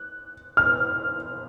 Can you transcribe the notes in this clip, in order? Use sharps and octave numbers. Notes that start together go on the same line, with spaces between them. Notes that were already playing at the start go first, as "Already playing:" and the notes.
Already playing: F#6
F6